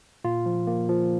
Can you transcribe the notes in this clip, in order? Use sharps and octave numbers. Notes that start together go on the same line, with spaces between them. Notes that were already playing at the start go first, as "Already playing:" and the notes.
A#2 F4
F3
A#3
F3